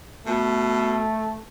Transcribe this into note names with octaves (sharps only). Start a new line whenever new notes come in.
B2 A3